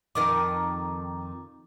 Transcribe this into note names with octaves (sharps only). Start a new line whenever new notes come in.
F2 D#3 A#4 D6